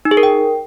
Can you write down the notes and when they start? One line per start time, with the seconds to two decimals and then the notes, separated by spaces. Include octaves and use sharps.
0.05 D#4
0.11 G#4
0.17 A#4
0.23 G5